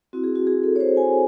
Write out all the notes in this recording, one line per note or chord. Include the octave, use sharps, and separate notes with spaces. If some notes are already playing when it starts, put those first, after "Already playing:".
C4 E4 F#4
G#4
F#4
G#4
A4
C#5
C5
G#5